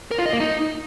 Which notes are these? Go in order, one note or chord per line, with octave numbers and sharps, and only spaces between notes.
A#4
F4
D#5
A#3
D#4